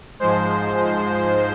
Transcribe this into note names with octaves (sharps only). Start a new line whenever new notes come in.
G#2 F3 G#3 C5